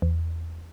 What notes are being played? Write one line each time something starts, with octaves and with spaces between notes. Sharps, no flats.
E2